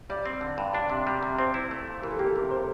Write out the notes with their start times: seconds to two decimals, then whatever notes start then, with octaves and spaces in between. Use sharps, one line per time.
0.10 G3 D5
0.26 C4
0.41 D3
0.58 G2
0.73 D4 D5
0.90 C3
1.07 G3
1.23 C3
1.39 C4 C5
1.54 E4
1.71 A3
1.87 A#2
2.02 E3 A#4
2.11 A4
2.19 A#3 G4
2.26 A4
2.35 C3 A#4
2.51 C5